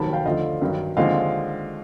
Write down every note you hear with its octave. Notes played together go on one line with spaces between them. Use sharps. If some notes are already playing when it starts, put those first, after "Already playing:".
Already playing: F1 D#2 D#3 F#3 A5 B5
F5 G5
D2 D3 F3 A3 D#5 F5
G2 D#3 F#3
D#2 D3 F3 G#3 C4 D#5 F5